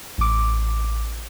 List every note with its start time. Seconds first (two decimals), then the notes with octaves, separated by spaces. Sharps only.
0.18 A1 D6